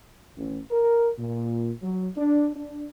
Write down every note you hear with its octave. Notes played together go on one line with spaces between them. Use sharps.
A1
A#4
A#2
F#3
D4
D4